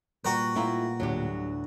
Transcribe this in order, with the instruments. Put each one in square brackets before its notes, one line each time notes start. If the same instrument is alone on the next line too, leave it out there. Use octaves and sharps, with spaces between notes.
[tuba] A#2 [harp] G3 G5 A#5 [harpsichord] F#4 B4
[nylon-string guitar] A3 E4 F4 [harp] G5 A#5
[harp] D2 A2 [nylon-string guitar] F#3 G4
[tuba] D3